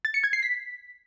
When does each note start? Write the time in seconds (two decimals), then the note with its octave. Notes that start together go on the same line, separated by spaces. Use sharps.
0.05 A6
0.14 C#7
0.24 G#6
0.33 C7
0.43 B6